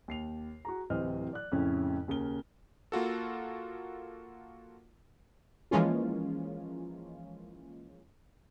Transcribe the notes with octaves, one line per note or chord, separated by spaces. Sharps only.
D#2 C7 F7
F#4 G#4 A#5
D1 C3 E3 C5 D#5 F6
D5 F#6
F2 A2 C#3 C#4 E4
D#2 C#3 A#4 G7
A#3 F4 F#4 A4
E3 F3 G#3 A#3 C#4 F4